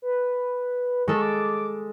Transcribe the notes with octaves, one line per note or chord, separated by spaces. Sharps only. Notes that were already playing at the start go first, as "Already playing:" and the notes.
B4
G#3 A4 C#6
D6